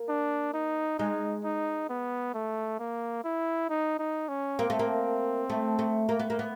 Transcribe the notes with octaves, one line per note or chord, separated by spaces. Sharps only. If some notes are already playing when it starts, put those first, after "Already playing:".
Already playing: A#3
D4
D#4
G#3 D#4
D#4
B3
A3
A#3
E4
D#4
D#4
C#4
A#3 C4
A3
A#3
A3
A3
A#3
B3
A#3
B3